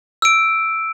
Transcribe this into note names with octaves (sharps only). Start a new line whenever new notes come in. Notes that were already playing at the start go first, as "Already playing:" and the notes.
E6 D7